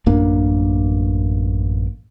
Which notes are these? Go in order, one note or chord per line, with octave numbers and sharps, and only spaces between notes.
A1 F#2 A#3 D4